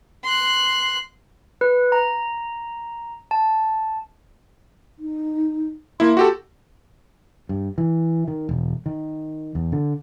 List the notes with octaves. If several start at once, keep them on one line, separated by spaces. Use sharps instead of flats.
C6 F#6
B4
A#5
A5
D#4
A#3 E4 C6
F#4 G4 A4
G2
E3
D#3
E1
D#3
E2
D3